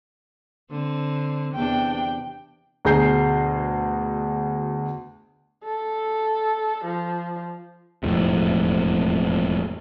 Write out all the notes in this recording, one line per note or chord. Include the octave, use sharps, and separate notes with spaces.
D3 C4
E2 C3 D4 G5
D2 B2 G#4 A#5 G6 C7
A4
F3
E1 F2 A2 C3